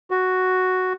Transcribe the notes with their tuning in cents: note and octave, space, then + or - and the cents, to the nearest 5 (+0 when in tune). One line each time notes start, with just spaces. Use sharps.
F#4 +0